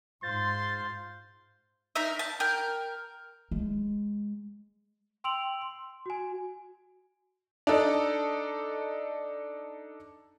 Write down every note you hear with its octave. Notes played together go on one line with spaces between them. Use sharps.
G#2 F4 C5 C6 A6
D#4 A#4 E5
A5
A#4 G5
G#3
G5 C6 E6 D7 F7 F#7
C6
F#4 G#5
D4 D#4 A4